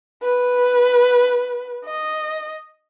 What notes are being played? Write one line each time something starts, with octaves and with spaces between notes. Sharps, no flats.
B4
D#5